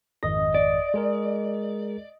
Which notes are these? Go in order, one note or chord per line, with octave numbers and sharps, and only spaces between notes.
G#1 F2 D#5 A#6
D5
G#3 G#4 A#4